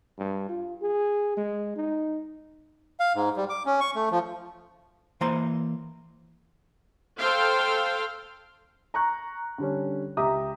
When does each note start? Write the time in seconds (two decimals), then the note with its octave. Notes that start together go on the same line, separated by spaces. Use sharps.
0.18 G2
0.49 F4
0.82 G#4
1.37 G#3
1.76 D#4
3.00 F5
3.15 G#2
3.37 G3
3.49 D6
3.66 C#4
3.80 C#6
3.95 A3
4.11 F3
5.21 E3 A#3 C5 A#5 C6
7.19 A4 C5 F5 G5
8.94 A#5 C#6 F#6
9.58 D3 G3 C#4
10.17 C#2 G4 E5 A#5 D#6